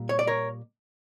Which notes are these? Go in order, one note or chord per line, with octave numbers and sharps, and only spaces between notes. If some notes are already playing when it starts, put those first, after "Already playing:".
Already playing: A#2 G3
C#5
D5
A#4 C#5